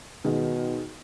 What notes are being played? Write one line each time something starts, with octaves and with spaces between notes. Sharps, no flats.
B2 D#3 G#3